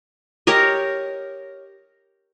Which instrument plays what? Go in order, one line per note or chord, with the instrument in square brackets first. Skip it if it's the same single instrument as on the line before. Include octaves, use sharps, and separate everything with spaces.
[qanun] G4 A#4 C#5 D#5